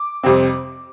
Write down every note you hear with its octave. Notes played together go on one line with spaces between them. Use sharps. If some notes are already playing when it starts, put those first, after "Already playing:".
Already playing: D6
F2 C3 G3 C4